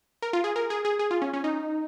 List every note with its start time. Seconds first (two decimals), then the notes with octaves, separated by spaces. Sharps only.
0.22 A#4
0.33 F4
0.44 G#4
0.56 A#4
0.70 G#4
0.85 G#4
0.99 G#4
1.11 F4
1.22 C#4
1.33 C#4
1.44 D#4